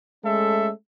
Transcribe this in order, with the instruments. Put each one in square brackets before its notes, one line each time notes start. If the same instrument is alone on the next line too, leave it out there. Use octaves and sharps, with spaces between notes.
[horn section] G#3 A3 C#4 A4 E5